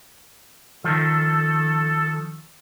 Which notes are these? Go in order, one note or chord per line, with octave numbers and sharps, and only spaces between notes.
D#3 F3 A4